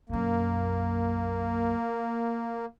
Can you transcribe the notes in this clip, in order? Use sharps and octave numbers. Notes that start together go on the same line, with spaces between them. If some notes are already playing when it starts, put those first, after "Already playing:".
B1 F#2 A#3